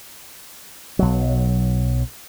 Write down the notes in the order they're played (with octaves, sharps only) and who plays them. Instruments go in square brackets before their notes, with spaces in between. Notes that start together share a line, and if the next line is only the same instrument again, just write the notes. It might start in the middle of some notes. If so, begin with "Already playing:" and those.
[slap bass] B1 F#3